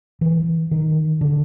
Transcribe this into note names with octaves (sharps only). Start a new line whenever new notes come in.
E3
D#3
D3